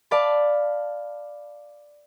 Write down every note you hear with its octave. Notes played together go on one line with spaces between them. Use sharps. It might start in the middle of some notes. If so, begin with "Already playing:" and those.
D5 F5 A5 B5